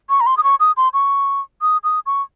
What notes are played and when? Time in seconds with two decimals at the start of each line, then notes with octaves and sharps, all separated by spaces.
0.10 C#6
0.21 A#5
0.26 C6
0.37 D#6
0.44 C#6
0.60 D#6
0.77 C6
0.93 C#6
1.62 D#6
1.84 D#6
2.06 C#6